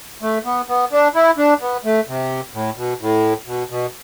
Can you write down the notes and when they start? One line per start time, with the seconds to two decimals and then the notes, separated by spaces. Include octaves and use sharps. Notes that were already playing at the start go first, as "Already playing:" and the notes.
0.22 A3
0.45 B3
0.69 B3
0.92 D4
1.15 E4
1.38 D4
1.61 B3
1.85 A3
2.08 C3
2.54 A2
2.77 B2
3.01 A2
3.47 B2
3.70 B2